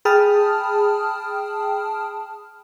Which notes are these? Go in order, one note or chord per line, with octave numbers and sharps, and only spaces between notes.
G#4 G5 A5 B5 D#6 F6